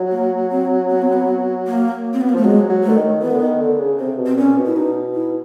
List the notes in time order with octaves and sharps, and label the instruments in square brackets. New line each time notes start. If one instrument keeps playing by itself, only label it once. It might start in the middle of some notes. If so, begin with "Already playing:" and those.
Already playing: [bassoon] F#3
[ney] A#3
C4
B3
C4
B3
A#3
C4
B3
A#3
[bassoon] F3 [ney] A3
[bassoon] F#3 [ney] G#3
[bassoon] F#3
[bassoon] D3 [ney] A3
[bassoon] D#3
[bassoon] E3 [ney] B3
[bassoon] D3
D#3
D3
C#3
[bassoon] C3 [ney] C4
[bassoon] B2
[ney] C4
[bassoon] A#2 [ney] C#4
[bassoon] B2
[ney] E4
[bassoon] B2 [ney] D#4
[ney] E4